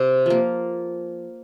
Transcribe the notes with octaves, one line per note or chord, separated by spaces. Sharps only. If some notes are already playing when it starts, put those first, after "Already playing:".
Already playing: C3
F3 A#3